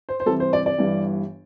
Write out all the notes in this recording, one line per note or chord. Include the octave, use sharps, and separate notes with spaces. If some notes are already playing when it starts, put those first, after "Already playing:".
C5
C5
C2 C3 E3 A4
C5
D5
D5
G1 G2 E3